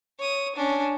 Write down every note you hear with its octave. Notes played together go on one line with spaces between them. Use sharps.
C#5 D#6
C#4 D4